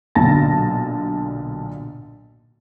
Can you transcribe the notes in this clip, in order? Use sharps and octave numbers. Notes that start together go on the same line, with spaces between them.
B1 A#2 D3 A5 A6 A#6